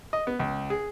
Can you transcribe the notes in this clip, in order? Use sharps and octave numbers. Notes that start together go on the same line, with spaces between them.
D#5
B3
C#2
G#4